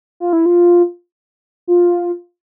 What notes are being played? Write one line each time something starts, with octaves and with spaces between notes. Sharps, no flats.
F4
E4
F4
F4